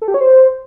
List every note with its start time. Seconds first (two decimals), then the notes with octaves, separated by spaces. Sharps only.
0.02 A4
0.08 G4
0.14 C#5
0.21 C5